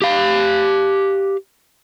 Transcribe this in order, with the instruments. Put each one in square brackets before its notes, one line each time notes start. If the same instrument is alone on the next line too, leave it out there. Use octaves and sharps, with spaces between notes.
[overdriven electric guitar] G4 F5